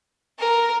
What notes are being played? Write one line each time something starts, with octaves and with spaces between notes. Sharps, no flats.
A#4